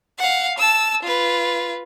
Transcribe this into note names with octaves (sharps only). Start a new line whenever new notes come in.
F5 F#5
A5 E6
F4 B4